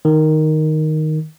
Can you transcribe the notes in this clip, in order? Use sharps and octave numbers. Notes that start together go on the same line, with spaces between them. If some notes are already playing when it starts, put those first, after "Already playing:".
D#3